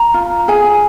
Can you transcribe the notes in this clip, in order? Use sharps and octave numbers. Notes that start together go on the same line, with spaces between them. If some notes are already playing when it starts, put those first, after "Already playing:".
Already playing: A#5
F4
G#4 G#5